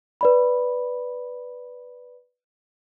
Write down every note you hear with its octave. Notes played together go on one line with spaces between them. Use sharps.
B4 D5 B5